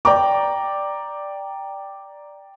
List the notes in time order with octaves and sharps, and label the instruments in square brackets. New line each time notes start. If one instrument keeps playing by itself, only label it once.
[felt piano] D5 G5 A#5 D6